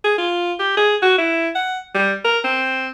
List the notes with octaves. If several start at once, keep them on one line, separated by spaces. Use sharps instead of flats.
G#4
F4
G4
G#4
F#4
E4
F#5
G3
A#4
C4